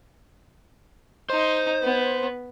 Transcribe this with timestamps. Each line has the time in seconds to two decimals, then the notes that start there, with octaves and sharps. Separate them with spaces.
1.30 D#4 C5
1.83 B3